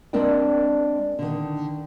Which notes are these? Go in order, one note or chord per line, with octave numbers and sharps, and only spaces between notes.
G#3 C4 D4 A#4 D5 G5
D3 D#3